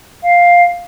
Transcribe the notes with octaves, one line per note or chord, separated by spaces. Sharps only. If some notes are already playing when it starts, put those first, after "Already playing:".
F5